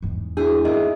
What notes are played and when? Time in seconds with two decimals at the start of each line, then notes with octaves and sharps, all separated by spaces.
0.02 E2 G#2
0.37 D4 E4 F#4 G#4
0.65 D#3 A#3 G#4 D#5 E5